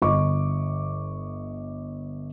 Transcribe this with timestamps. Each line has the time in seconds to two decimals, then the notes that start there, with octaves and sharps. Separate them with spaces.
0.02 G1 D#5 C#6 D6